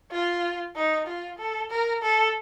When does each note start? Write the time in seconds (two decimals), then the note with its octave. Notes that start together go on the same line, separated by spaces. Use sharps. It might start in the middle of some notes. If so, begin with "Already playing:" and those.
0.12 F4
0.76 D#4
1.07 F4
1.39 A4
1.71 A#4
2.03 A4